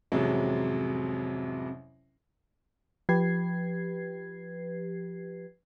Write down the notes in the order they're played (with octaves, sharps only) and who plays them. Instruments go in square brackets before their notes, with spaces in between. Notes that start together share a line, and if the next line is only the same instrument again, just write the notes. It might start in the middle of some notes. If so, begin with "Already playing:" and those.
[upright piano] A1 F2 C3 F#3 G#3
[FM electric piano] F3 G4 B4 G#6 C7